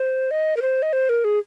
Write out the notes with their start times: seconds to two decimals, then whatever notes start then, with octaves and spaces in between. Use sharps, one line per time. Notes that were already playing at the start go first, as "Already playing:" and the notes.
Already playing: C5
0.31 D#5
0.57 A#4
0.62 C5
0.82 D#5
0.93 C5
1.09 A#4
1.24 G#4